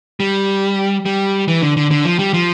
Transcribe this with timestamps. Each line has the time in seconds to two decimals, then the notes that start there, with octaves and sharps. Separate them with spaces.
0.20 G3
1.05 G3
1.48 E3
1.62 D3
1.77 D3
1.91 D3
2.05 F3
2.19 G3
2.34 F3